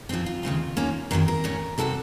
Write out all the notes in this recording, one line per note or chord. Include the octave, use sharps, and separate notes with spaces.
F#2 F3 C4 F4
F4
D#2 C#3 A3 C4
D#2 D#3 A#3 C#4
F#2 D#3 F#3 C4 A#4
A#4
A2 A3 C#4
C3 F#3 C4 A4